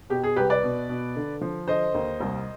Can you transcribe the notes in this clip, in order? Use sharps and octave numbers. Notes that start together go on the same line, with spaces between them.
B2 G4
G#4
C2 G4 B4
B4 D5
B2
B2
D3
F3
D3 C5 D#5
D#2
C2